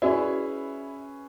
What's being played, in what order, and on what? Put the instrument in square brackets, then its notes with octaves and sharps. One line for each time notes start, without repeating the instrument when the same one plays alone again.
[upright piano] C#4 G#4 B4 [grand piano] E4 [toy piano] F#4 D5